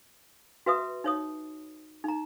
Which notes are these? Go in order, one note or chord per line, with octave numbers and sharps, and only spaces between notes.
F#4 B4 E5 D#6
D#4 C#5 D#6
D#4 A#5